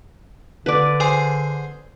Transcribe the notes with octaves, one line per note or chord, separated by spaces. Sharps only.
D3 B4 D5
G#4 C5 G#5